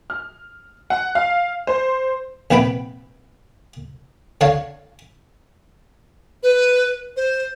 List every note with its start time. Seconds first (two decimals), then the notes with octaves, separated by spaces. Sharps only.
0.10 F6
0.90 F#5
1.15 F5
1.67 C5
2.51 A#1 C3 B3 B4 G5 B5
4.41 D3 C#5 F5 A5
6.43 B4
7.17 C5